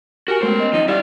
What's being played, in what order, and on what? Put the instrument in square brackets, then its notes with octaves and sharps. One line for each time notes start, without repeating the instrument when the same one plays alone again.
[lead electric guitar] F#4 [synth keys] G4 G#5 [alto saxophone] A#4
[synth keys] G#3 A3 F#4 [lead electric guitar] B3 C5
[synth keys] C#4 D#5
[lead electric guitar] E2 F3 [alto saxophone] D#4
[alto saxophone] G3 [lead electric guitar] E4 F5